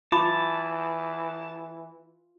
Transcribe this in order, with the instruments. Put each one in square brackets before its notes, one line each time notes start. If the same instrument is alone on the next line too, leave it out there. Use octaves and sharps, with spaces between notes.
[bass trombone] E3 [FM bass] F4 [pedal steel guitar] A5 [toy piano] B5 D6